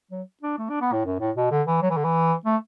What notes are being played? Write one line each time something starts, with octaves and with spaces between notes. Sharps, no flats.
F#3
D4
A3
D4
B3
A2
F#2
A2
B2
D3
E3
F#3
E3
D3
E3
A3